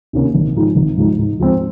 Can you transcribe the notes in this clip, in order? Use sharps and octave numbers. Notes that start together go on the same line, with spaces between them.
C3 D#3 A#3 C#4
G#1
G#2 F3 G#3 D#4
G#1
G#2 F3 G#3 D#4
G#2
F3 G#3 C4